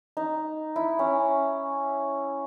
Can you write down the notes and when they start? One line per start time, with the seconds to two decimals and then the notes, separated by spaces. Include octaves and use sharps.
0.17 D#4
0.76 E4
0.99 C#4